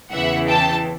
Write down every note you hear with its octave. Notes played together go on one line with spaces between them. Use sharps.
E2 C#3 E3 E5 F#5
G5 A5